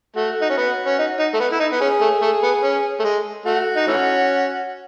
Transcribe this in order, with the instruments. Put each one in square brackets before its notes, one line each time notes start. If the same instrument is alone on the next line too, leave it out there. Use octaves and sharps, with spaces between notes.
[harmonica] A3 [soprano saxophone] F#4
[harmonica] D#4
C#4
B3
C#4
D#4
D#4
A3
B3
E4
D#4
B3
[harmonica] C#4 [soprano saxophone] G#4
[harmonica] A3
A3
B3
C#4
A3
G#3
[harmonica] A3 [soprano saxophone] F#4
[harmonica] D#4
E3 A3 C#4